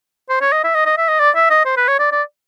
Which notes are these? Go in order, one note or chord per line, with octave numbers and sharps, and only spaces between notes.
C5
C#5
D#5
E5
D#5
D#5
E5
D#5
D5
E5
D#5
C5
B4
C#5
D5
D5